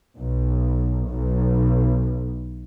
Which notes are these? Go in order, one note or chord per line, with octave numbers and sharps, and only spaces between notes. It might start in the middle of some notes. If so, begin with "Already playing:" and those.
B1
B1